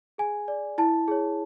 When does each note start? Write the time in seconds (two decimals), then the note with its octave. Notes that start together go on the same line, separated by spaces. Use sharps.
0.18 G#4 G#5
0.48 D5
0.78 E4 A5
1.08 G#4 C#5